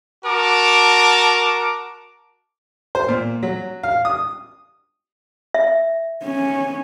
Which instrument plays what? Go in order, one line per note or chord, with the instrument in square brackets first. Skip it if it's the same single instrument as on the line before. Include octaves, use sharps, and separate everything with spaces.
[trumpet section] F#4 A#4 A5 D6
[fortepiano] C5
A#2
F#3
F5
D#6
[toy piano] E5
[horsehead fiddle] C#4